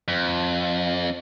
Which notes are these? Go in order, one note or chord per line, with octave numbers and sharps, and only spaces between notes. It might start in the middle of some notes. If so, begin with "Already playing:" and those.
F2